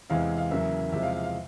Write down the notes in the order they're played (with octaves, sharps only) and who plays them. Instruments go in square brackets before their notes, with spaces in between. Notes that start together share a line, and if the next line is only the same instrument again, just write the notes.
[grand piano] E2 C3 E3 G#3 F5
F5
E2 C#3 F#3 A#3 E5
E2 C3 F3 G#3 E5
F5
F5
F5